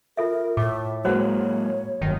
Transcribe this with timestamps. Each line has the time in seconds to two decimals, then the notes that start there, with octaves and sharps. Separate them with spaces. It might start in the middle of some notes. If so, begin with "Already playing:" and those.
0.17 F4 A4 A#4 E5
0.57 A2 E5 D6
1.05 F#3 G#3 A#3 F#4 C5 C#5 F#5
2.02 G1 F#2 D#3